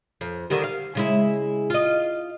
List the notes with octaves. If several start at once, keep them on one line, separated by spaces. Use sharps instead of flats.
F2
D3 D#3 G3
F5
C#3 G#3 E4
F4 D#5